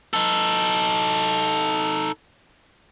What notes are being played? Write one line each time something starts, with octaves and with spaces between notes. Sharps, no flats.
D#4 A4